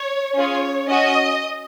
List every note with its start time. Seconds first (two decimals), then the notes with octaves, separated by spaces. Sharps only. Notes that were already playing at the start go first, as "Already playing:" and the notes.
Already playing: C#5
0.34 C#4 F4 G#4 C#5
0.87 C#4 F#4 D#5